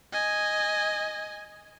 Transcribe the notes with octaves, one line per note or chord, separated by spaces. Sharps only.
D#5 G#5